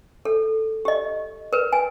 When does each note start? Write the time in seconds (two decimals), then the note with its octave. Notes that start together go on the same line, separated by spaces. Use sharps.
0.25 A4
0.85 G4 D#5
1.53 A#4 B4
1.73 G#5